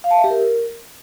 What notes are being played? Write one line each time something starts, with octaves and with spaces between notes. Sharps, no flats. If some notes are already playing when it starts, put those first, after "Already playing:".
F5
A5
E5
G4
A#4